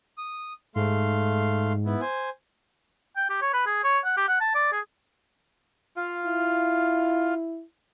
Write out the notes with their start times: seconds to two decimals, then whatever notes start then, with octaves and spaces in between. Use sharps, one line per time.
0.18 D#6
0.76 G#2 A3 F5 C6
1.86 B3 E4
2.01 C5 G#5
3.17 G5
3.30 G4
3.42 C#5
3.54 B4
3.66 G#4
3.84 C#5
4.05 F#5
4.17 G4
4.28 F#5
4.41 A5
4.55 D5
4.72 G#4
5.96 F4 F5
6.26 E4